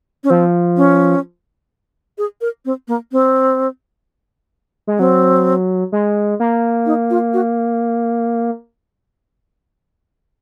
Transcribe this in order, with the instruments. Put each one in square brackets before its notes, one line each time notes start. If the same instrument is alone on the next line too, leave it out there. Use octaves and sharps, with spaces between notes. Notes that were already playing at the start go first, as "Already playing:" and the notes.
[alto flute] C#4
[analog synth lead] F3 [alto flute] C4
[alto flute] C#4
G#4
A#4
C4
A#3
C4
[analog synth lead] G#3
[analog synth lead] F#3 [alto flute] C4
[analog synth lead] G#3
A#3
[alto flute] D#4
F4
F#4